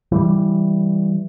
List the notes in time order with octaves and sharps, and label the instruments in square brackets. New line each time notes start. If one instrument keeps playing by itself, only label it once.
[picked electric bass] E3 G3